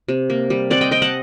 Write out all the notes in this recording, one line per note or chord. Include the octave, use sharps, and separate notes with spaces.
C3
A#3
G3
C4 D5 F#5
D#5 G5
C4 D#5 G5
F#5 A5